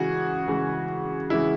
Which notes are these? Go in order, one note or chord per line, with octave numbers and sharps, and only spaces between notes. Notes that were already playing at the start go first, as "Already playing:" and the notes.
Already playing: C#3 E3 G#3 F#4 G#4
C#3 E3 G#3
C#3 E3 G#3 E4